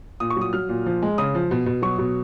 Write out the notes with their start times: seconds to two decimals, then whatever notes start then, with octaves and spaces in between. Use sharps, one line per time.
0.20 A#2 D#6
0.30 C#6
0.37 F#3 D#6
0.53 F#3 F6
0.69 A#2
0.86 F3
1.02 G#3
1.18 C#3 D#6
1.35 F3
1.51 B2
1.66 B2
1.82 F#3 C#6
1.98 B2